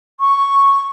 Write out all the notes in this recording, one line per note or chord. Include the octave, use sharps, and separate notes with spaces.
C#6